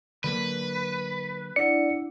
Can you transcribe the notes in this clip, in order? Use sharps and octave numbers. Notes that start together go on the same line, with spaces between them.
D3 F#3 A#3 B4
D4 E4 D5 F#5 C#7